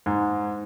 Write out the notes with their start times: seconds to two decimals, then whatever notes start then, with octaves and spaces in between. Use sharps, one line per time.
0.06 G#2